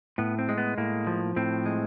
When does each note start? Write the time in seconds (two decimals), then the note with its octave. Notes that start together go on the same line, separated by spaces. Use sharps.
0.18 A2 B3
0.39 C4
0.49 G#3
0.58 B3
0.78 A2 A#3
1.07 F3
1.36 A2 C4
1.66 G#3